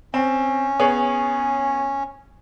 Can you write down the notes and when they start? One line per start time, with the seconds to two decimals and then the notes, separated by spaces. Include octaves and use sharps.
0.14 C4 C#4
0.80 B3 G#4 C#5